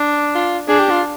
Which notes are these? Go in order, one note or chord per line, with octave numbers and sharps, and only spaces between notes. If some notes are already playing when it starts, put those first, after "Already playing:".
Already playing: D4
F4
D4 G#4
G4
F4